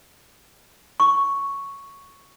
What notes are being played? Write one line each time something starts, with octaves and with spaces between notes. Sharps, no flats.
C#6